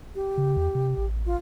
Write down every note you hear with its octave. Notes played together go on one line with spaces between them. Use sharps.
G4
C#3
E2
C3
A1
F4